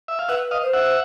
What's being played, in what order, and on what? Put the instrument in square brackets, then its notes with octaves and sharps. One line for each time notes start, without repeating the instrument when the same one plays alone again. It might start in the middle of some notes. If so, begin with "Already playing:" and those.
[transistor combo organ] E5
F5
[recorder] B4 [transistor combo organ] E5 F#5
[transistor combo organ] D#5 F5
[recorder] C5
[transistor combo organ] E5 F#5